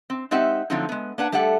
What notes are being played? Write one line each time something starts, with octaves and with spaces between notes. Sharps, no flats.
C4
G#3 C4 D#4 G4 E5 F#5
D3 F3 F#3 A3 C4 D#4
G#3 B3
A#3 D4 B4 F#5
G3 A3 G4 A4 F#5